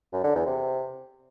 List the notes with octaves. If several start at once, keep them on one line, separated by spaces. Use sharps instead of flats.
F#2
D3
E2
C3